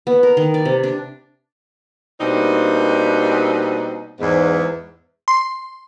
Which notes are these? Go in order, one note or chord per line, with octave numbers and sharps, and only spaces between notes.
B3
A#4
D#3
D5
C3
D4
B2 G3 A#3 C4 D4 D#4
E2 G#2
C6